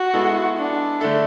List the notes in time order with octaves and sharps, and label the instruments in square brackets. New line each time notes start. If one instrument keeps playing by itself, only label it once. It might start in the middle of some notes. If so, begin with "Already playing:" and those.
Already playing: [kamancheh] F#4
[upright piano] G#3 B3 E4 A4
[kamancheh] D4
[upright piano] D3 A3 D4 A4 E5